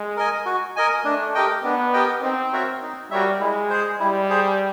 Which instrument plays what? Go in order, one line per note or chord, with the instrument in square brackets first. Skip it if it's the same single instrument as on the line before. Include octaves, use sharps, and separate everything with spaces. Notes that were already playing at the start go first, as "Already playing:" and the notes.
Already playing: [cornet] G#3
[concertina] A#4 D#5 G#5
F#4
A#4 D#5 G#5
[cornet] A3 [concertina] D4
[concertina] G4 A#4 D#5 G5
[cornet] B3 [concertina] D4
[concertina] G4 A#4 D#5 G5
[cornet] C4 [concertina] D#4
[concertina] F#4 A#4 C#5 E5
D#4
[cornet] G3 [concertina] F#4 A#4 C#5 E5
[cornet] G#3 [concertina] E4
[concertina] G#4 C5
[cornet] G3 [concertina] E4
[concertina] G#4 C5